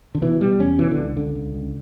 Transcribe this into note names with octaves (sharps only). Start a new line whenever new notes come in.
D3
B2 E3
B2 G3
E2 C#4
B2 E3
D3
C#2
C#2 D3
C#2
C#2